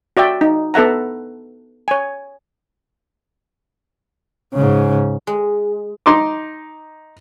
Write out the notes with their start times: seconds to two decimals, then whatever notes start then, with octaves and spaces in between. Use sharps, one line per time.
0.17 F#4 D5 E5 G5
0.41 D#4
0.74 B3 A4 E5 F#5 A#5
1.88 C#5 G#5
4.54 G#2 C#3
5.27 G#3
6.06 D#4 C6 D6